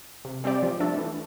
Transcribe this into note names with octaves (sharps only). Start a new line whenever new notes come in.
C3
G3 C4 G4 D5
F3
A3 D4 A4
E3